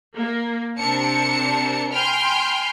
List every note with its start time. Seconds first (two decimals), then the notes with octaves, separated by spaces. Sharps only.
0.14 A#3
0.79 C3 C4 D4 A#4 A5 C#7
1.92 G5 G#5 B5 C6 F6 G6